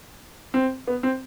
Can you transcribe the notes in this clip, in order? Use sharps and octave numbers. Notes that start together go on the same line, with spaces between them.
C4
B3
C4